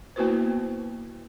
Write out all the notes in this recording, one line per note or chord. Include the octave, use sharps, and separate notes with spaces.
A#3 B3 E4 F#4 B4 C5